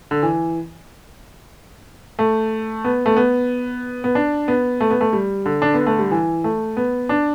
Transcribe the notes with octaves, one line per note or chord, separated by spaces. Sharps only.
D3
E3
A3
B3
A3
B3
B3
D4
B3
A3
B3
A3
G3
D3
D4
B3
A3
G3
E3
A3
B3
D4